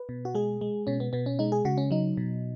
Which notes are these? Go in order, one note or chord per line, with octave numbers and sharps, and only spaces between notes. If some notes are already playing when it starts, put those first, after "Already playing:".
Already playing: B4
B2
F#4
G#3 G#4
G#3
B2 C#4
B3
B2 B3
C#4
G#3 D#4
G#4
C#3 F#4
C#4
F#3 D#4
B2